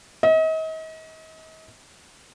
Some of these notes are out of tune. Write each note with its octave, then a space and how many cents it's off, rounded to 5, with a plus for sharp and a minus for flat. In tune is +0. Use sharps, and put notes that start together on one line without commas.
D#5 +40